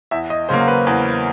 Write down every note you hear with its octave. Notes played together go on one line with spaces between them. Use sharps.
E2 E5
D#5
C#3 F#3 A#3 C5
B4
E2 B4